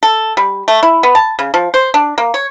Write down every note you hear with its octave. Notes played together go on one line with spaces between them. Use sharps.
A4
G3
A3
E4
B3
A5
C#3
F3
C5
D4
A#3
C#5